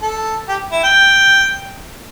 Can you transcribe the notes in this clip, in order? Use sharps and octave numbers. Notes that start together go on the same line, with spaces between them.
A4
G4
E4
G5